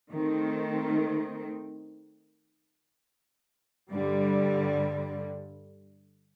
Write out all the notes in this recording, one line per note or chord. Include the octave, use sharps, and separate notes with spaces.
D#3 A3 C4
G2 D3 G3